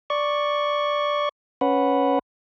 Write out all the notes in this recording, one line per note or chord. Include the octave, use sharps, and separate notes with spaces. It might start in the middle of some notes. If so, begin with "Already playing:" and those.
D5 C#6
C#4 B4 F#5